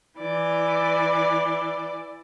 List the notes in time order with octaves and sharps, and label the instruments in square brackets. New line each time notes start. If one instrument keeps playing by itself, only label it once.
[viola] E3 D5